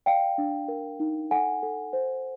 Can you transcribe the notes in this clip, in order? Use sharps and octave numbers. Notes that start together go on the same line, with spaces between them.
D5 F5 G5
D4
A#4
D#4
A4 F#5 G#5
A4
C5